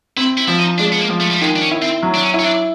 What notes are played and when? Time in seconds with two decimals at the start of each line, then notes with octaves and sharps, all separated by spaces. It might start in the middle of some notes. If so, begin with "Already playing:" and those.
0.17 C4 E4
0.37 E4
0.48 F3 E4
0.59 D#4
0.78 G#3 D4
0.92 B3
0.99 A#3
1.10 F3
1.20 A3
1.31 G3
1.41 D#3 G#3
1.56 D4
1.61 C#4
1.71 E4
1.82 C4
2.03 F#3
2.14 D4
2.23 C#4
2.34 E4
2.39 C#4
2.43 D4